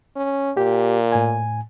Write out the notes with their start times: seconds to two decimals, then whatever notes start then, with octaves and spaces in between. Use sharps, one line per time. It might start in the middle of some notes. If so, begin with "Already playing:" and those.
0.16 C#4
0.57 A#2 G4
1.12 A2 G#5